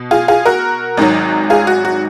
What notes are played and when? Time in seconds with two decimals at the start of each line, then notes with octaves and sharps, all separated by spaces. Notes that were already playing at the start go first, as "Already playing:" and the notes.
Already playing: B2
0.11 F4 G#4
0.28 F4 G#4
0.45 F#4 A#4
0.97 G#1 G#2 D#3 F#3
1.50 F4 G#4
1.67 F#4
1.85 F#4